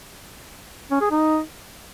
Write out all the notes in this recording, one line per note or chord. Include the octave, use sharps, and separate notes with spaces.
C#4
G#4
D#4